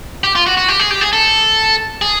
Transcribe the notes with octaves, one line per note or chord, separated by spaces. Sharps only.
G4
F4
F#4
F#4
G4
G#4
G4
G#4
A4
G#4